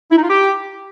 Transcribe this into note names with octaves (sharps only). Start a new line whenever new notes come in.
E4
D#4
F4
G4